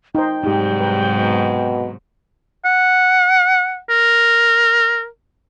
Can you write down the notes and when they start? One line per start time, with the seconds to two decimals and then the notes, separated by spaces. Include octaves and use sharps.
0.15 D#4 C5 G5
0.44 G#2 C3 F#3 G3 D#4 G4
0.80 B4 A#5
1.18 B2
2.65 F#5
3.90 A#4